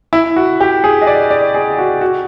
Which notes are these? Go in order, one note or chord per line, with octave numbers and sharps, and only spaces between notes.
E4
F#4
G4
G#4
D#5
D5
D5
G#4
F#4
F#4